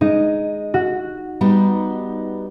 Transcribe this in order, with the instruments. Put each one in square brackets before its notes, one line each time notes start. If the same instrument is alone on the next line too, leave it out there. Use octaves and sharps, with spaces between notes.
[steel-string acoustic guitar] G#3 [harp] D#4
[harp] F#4
[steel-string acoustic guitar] G3 B3 D#4